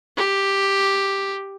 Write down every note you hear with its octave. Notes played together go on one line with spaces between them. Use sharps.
G4